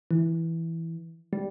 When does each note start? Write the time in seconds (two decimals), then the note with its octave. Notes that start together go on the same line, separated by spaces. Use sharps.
0.11 E3
1.33 G3